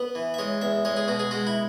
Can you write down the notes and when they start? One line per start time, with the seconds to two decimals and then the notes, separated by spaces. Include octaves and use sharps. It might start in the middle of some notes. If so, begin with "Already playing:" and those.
Already playing: B3 B4
0.15 E3
0.34 E5
0.39 G#3 C#5
0.61 E2 E5
0.85 G#3 C#5
0.97 G#4
1.08 B2 F#4
1.20 G#4
1.31 G#3 F#4
1.47 E4